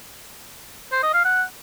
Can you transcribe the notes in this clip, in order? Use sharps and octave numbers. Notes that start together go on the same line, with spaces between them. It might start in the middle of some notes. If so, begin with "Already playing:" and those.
C5
D#5
F5
F#5